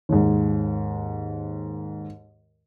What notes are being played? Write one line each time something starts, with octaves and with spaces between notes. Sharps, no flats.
D#2 G#2